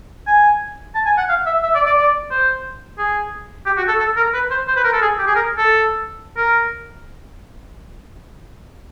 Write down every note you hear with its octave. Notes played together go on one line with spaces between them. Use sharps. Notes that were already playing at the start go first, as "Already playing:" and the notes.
G#5
A5
G#5
F#5
F5
E5
E5
D5
D5
D5
C5
G#4
G4
F#4
A4
A4
A#4
B4
C5
C5
B4
A#4
A4
G#4
G4
G#4
A#4
A4
A#4